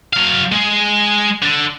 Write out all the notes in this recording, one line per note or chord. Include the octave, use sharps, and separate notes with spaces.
F#3 F5
G#3 G#4
D3 D4